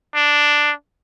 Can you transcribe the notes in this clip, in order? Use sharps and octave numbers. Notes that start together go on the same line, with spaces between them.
D4